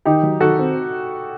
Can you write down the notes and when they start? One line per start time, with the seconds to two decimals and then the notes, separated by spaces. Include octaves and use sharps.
0.05 D#3 D#4 G4
0.23 F#3
0.40 D#3 F#4 A4
0.58 C4